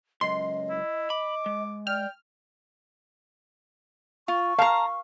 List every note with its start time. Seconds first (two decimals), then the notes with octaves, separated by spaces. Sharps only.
0.21 C#2 F#2 D#5 C6
0.70 E4
1.10 B5 D6
1.46 G#3
1.87 D5 G5 F6
4.28 F4 C#6
4.59 F5 A5 A#5